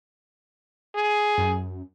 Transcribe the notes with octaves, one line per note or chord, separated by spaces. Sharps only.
G#4
F#2